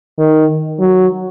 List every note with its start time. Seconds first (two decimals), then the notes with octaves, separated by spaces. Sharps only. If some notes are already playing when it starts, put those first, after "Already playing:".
0.18 D#3
0.80 F#3